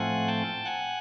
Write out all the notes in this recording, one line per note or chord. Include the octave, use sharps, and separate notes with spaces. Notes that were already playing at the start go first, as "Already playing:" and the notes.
Already playing: A2 F3 A3 C4 F#5 G#5
G5 A5
F#5 G#5